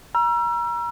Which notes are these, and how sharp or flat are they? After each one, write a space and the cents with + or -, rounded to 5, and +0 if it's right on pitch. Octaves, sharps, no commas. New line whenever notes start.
A#5 +35 E6 +35